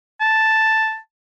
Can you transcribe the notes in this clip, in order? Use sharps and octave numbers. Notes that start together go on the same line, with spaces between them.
A5